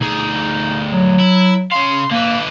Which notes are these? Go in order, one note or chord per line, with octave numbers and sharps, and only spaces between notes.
D2 D#4 G#4
F#3
E4
C#3 F5 C6
D3 A#3 B4